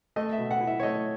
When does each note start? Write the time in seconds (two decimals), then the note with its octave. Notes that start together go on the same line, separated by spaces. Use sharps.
0.16 A3 D#5
0.33 E5
0.38 B2
0.51 F#5
0.61 E4
0.67 E5
0.80 C#5
0.83 A3 D#5